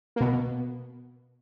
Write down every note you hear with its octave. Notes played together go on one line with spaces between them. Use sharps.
A#3
B2 B3